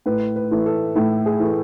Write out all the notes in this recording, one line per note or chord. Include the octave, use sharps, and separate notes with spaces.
A2 B4
B4
E3 A3
A4
A2 E4
G#4
E3 A3